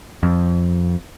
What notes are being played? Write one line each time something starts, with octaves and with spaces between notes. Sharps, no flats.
F2